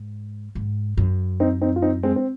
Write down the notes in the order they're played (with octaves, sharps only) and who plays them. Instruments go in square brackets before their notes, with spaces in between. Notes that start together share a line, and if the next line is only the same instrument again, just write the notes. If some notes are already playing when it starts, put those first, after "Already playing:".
Already playing: [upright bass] G#2
G#2
F#2
[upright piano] C4 D#4
C4 D#4
F4
C4 D#4
G#3 C4
C4